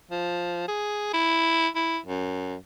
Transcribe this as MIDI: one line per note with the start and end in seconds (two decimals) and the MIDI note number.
0.11 0.63 53
0.68 1.13 68
1.13 1.67 64
1.76 1.98 64
2.06 2.56 42